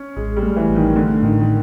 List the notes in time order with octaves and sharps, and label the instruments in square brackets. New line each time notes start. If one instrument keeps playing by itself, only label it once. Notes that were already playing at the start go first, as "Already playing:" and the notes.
Already playing: [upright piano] C#4
[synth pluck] A1 [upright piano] G#3
[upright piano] G3
[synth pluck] A3
[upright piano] E3
[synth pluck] A1
[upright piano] D#3
[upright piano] D3 [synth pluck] A3
[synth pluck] A2 [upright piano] D#3
[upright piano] D#3